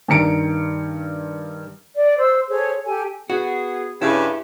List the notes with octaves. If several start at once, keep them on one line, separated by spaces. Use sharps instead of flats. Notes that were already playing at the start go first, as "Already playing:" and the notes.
G2 D#3 A#5 C#7 D7
D5
C5 E6
G#4 A4 C5 C#5
G4 A4 G#5
B3 F#4 G#4
G2 C#3 E4 G4